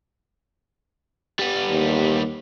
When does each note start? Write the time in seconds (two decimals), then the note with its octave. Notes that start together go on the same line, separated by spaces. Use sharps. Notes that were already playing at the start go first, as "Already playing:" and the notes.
1.39 G3 B3
1.70 D#2